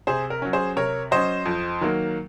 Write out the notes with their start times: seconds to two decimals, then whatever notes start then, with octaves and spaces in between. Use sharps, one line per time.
0.07 C3 G#4 C5
0.30 A#4
0.42 F#3 C#4
0.53 G#4 C5
0.76 C3 A#4 C#5
1.11 F#3 C#4 C5 D#5
1.45 F2
1.81 D#3 F#3 A#3